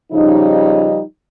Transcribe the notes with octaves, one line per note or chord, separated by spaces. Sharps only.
C#3 F3 G3 D#4